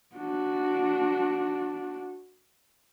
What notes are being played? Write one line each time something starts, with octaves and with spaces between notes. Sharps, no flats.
D4 F#4